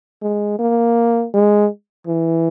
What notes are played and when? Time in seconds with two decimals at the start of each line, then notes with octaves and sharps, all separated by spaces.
0.22 G#3
0.59 A#3
1.34 G#3
2.07 E3